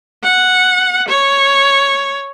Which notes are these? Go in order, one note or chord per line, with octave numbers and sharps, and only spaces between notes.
F#5
C#5